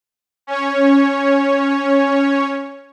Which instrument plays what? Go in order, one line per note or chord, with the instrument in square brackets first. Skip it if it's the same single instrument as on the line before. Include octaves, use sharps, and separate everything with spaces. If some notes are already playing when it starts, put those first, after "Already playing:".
[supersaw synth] C#4 C#5